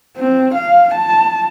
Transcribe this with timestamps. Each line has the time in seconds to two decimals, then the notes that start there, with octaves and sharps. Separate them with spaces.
0.17 C4
0.55 F5
0.94 A5